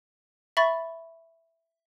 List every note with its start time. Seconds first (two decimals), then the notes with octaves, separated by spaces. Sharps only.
0.57 E5 B5 C#6 A6